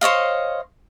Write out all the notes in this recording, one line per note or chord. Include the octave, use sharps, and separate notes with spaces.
C5 C#5 D#5 F5